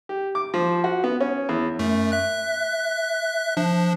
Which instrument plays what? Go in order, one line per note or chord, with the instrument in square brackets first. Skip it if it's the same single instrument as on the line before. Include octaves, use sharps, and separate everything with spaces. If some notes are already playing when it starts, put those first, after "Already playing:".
[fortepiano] G4
D6
F3
F#4
B3
C#4
E2
[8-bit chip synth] F#2 A3
E5 F#6
F3 D4